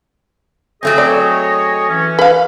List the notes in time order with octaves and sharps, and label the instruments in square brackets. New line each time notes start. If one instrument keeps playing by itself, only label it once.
[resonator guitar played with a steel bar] F#3 A3 C4 [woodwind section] G#4 C#5 D#5
[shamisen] D5
[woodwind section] E3 C#4
[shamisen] B4 F5